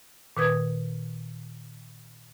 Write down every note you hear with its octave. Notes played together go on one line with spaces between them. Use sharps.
A#2 D#3 B4 D#6 G#6